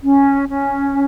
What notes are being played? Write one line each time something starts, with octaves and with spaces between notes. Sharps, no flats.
C#4
C#4